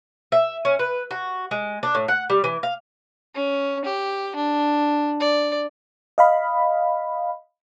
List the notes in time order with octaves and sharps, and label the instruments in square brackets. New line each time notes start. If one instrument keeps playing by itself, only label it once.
[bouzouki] E5
C#4
B4
F#4
G#3
D4
A2
F#5
G3
E3
F5
[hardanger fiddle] C#4
G4
D4
D5
[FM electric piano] D#5 F5 B5